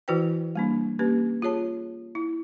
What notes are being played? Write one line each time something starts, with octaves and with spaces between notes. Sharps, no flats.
E3 E4 F#4 B4 C5 G5
G3 A#3 D4
A#3 C#4 G4 B4
F4 G#4 C#5 A5
E4